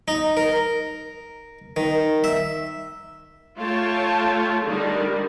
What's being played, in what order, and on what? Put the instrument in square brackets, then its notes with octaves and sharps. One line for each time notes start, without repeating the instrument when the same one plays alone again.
[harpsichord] D#4
A#4
D#3
E5
[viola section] A3 F4 C#5 G5 A5
D3 D#3 G3 A#4